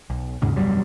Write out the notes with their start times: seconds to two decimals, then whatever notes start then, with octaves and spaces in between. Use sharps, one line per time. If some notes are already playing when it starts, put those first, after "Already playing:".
0.10 B1
0.42 D#2 G#2 C#3
0.56 E1 F#2 F#3 G3